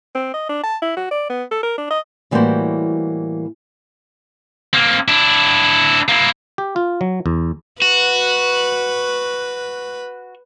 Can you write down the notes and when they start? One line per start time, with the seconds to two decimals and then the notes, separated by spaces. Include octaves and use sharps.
0.15 C4
0.34 D#5
0.49 D4
0.63 A5
0.82 E4
0.96 F#4
1.11 D5
1.29 B3
1.51 A4
1.63 A#4
1.78 D4
1.90 D#5
2.31 A2 E3 G3 A#3 F#4 C5
4.74 A#3 C4
5.08 D4 E4
6.09 A#3 E4
6.58 G4
6.76 F4
7.01 F#3
7.26 E2
7.82 F#4 B4